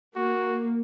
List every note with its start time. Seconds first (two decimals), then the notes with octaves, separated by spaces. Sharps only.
0.16 A#3 F#4